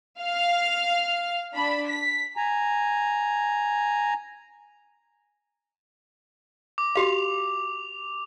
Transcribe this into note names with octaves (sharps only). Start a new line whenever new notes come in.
F5 F6
D4 B5
B6
G#5 A#5
D6
F#4 G4 F5 F7